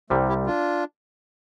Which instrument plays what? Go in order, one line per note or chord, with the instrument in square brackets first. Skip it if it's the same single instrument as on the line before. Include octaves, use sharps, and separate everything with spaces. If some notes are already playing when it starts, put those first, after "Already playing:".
[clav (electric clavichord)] C2 C3 G3 [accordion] F3 A3
[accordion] E4 G4
D4 F4